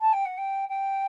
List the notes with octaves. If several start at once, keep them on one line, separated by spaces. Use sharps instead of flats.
A5
G5
F#5
G5
G5